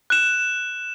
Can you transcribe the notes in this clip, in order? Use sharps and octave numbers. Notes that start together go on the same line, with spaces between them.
F#6 E7